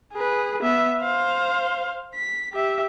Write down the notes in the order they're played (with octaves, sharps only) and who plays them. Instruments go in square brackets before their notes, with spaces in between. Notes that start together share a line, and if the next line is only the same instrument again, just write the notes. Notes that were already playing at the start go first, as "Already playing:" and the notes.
[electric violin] G#4 B4
B3 E5
C5 F5
B6
G4 E5